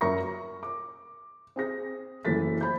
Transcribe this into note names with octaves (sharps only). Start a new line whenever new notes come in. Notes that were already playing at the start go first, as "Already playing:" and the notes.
F#2 A#4 E5 A#5 C#6 A#6
A#4
D6
C4 G#4 A#6
F#1 F#2 E3 A3 A6 B6
C5 B5 G6